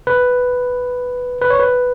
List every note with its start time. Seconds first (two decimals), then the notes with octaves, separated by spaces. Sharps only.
0.07 B4
1.41 B4
1.50 C#5
1.59 B4